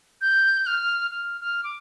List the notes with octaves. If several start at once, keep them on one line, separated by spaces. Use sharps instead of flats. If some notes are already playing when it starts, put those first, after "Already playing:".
G6
F6
F6
F6
D6